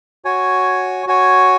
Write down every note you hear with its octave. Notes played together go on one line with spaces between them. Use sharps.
F#4 C#5 G#5
F#4 C#5 G#5